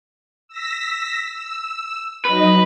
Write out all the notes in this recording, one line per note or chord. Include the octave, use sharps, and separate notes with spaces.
E6 A#6 B6
E6
F#3 D#4 B4 D#5